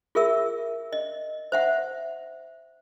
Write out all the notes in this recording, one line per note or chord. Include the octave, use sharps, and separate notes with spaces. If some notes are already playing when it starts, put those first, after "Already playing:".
F4 G#4 A#4 E5 E6
D#5
C5 E5 F#5